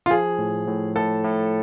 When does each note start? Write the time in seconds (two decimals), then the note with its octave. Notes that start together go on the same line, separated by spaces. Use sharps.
0.06 F4
0.11 F3 G#4
0.39 A2
0.67 A2
0.96 A2 A4
1.25 A2